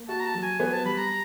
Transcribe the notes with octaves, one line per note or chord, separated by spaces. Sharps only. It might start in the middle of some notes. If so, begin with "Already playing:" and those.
Already playing: A#3
F#4 A5
A#5
A5
F#3
G#5
B3 G#5
A5
G3 B5
A#5